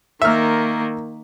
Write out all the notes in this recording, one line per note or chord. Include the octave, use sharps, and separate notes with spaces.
D#3 A#3 E5 F6